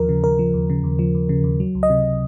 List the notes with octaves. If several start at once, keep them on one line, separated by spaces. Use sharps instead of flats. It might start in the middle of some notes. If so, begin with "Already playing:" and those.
Already playing: D#2 F3 A#4
C#3
D#2 A#4
F3
D#2
C#3
D#2
F3
D#2
C#3
D#2
F#3
C#2
D#5
C3